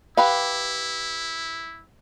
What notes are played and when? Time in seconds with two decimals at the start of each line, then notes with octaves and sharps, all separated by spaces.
0.17 E4 G4 B4 F5